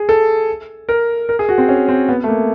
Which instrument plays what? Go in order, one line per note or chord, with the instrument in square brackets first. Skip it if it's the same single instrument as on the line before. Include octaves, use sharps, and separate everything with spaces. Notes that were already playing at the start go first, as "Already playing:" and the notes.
Already playing: [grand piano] G#4
A4
A#4
A#4
G#4
F#4
C4
C#4
C4
B3
A3
A#3